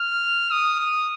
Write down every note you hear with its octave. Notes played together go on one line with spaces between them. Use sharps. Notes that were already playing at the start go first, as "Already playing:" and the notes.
Already playing: F6
D#6
D#6